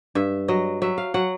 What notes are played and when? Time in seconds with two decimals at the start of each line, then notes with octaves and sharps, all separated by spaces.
0.15 G2 E5
0.48 F#3 D#5
0.82 F#3 E5
0.98 F5
1.14 F#3 F#5